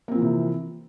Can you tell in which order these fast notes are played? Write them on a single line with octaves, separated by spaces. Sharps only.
A#3 C4 F3 E3 C3